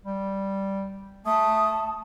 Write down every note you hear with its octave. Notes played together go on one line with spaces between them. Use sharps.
G3
A3 A5 D#6